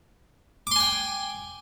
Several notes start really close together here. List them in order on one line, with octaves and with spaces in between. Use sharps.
D6 C6 G#5 G5